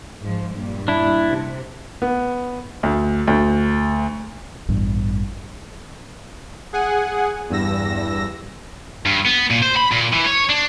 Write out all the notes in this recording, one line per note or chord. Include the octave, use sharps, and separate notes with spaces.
G#2 F3
G2 A#2 G3
D4 E4
C3
B3
D2
D2
A1 E2 G2
G#4 F#5 G#5
E2 G2 E6 A#6
G2
B3
A#2
C5
B5
A#2
E3
C#5
D4